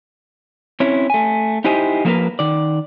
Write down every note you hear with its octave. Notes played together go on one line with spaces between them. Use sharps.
C4 C#4 E4 C#5
A3 G#5
D#4 E4 G4 C5 D#5 G#5
F3 A3 A#3 G#4 A#4 B4
D#3 D5